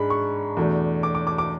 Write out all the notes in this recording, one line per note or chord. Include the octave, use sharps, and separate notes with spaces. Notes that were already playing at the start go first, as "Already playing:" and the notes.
Already playing: G#2 G#3 D4 B5
C#6
E2 B2 A3 D4
D6
D6
D6
D6